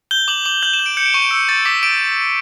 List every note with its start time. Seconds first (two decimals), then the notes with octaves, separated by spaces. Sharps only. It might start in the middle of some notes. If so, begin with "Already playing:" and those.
0.11 G6 G7
0.28 D6 F#7
0.45 D6 F#7
0.62 G6 F#7
0.73 E7
0.79 G6
0.86 D7
0.97 G6 C#7
1.06 D7
1.14 C#6 E7
1.22 D7
1.31 E6 C#7
1.49 C#6 A6
1.65 D6 B6
1.83 D6 D7